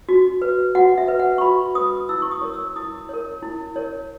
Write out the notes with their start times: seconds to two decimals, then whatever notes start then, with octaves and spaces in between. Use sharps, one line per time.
0.09 F#4
0.42 B4
0.75 F#4 F#5
0.98 E5
1.08 B4
1.19 F#5
1.38 C#6
1.41 F#4 B5
1.75 B4 D#6
2.09 E4 E6
2.22 C#6
2.31 D#6
2.41 A#4 C#5
2.54 E6
2.76 E4 D#6
3.09 A#4 C#5
3.43 E4
3.76 A#4 C#5